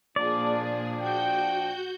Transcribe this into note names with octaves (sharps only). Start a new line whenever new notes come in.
A#2 F3 D4 G#4 D5
F#4 G5 G6